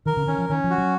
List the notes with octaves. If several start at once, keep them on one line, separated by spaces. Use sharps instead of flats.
D#3 A#4
C#3
D#3 C#4
F3
D#3 C#4
F3
F#4
F#3